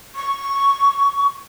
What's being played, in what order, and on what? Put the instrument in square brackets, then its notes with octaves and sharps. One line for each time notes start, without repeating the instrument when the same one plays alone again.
[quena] C#6